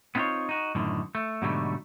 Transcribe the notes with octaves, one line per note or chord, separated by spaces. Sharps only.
B3 C4 D#4 F4 C5 C#5
D#4 F#4
F#2 A2 D3 D#3
A3
G#2 B2 D3 F#3 G3 A3